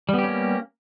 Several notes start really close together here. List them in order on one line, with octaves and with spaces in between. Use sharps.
G3 B3 G4 C#4 A#3